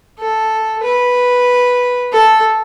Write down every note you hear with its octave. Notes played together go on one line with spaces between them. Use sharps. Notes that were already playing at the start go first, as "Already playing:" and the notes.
A4
B4
A4